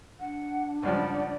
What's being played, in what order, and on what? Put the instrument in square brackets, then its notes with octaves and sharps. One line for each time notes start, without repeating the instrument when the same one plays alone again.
[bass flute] D4 [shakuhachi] F#5
[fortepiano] C#2 G2 F3 [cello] D5 [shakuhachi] F#5